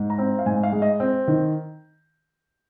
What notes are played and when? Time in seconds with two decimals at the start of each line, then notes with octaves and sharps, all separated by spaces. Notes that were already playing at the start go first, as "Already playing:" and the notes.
Already playing: G#2
0.10 A#5
0.18 C4
0.39 F5
0.46 G#2 G#5
0.63 F5
0.72 G#3
0.82 D#5
1.00 C4
1.28 D#3